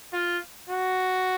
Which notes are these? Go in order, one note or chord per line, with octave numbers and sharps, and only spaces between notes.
F4
F#4